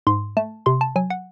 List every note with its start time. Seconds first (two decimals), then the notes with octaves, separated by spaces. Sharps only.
0.07 G#2 C6
0.37 A3 A5
0.66 C3 C6
0.81 A5
0.96 F#3 G#5
1.10 F#5